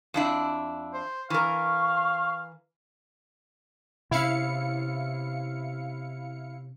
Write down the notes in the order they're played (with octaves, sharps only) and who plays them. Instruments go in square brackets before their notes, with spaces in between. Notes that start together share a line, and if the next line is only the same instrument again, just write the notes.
[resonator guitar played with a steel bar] F2 D4 E4
[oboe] C5
[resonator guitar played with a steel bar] E3 A#4 [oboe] F5 [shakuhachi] C#6
[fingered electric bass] C3 C#4 [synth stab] E4 F5 C#7